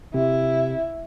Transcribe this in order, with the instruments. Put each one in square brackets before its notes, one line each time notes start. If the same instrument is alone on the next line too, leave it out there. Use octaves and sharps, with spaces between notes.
[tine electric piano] C3 [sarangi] E4